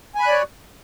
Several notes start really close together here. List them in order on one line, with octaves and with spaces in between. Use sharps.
G#5 B5 F#6 D5 C#5